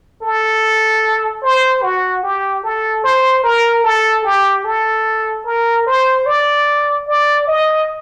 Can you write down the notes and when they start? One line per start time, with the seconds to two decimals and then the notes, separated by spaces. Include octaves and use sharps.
0.22 A4
1.43 C5
1.82 F#4
2.23 G4
2.63 A4
3.04 C5
3.44 A#4
3.84 A4
4.25 G4
4.64 A4
5.45 A#4
5.87 C5
6.26 D5
7.08 D5
7.47 D#5